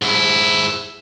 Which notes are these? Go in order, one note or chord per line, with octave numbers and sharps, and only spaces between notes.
G#2 E4